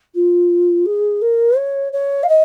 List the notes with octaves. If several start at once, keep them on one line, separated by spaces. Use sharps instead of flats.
F4
G#4
A#4
C#5
C#5
F5
D#5